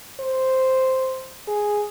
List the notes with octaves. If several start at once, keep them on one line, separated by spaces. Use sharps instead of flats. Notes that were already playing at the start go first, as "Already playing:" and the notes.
C5
G#4